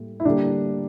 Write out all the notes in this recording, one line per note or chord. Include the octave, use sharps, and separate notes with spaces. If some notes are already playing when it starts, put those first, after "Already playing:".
Already playing: A2 G3 A#3
E4
D3 G3 A#3 D4